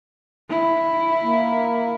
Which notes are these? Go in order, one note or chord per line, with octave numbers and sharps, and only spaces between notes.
E4
A#3